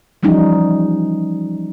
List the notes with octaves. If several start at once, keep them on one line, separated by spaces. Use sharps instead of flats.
E3 F3 G3 C#4 D#4